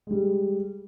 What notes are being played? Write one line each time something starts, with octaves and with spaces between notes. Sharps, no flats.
G3 G#3